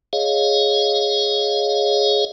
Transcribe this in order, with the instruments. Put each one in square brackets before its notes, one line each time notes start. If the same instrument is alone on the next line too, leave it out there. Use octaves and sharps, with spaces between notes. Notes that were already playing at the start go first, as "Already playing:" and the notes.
[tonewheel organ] G#4 C#5 D#5 F5